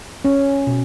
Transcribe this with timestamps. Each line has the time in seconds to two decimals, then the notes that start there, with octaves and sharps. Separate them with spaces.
0.25 C#4
0.67 B2